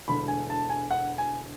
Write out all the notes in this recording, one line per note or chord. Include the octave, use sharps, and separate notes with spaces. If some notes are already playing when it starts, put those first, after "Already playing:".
E1 D2 D3 B5
G#5
A5
G#5
F#5
G#5